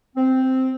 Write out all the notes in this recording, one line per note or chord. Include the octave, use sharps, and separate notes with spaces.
C4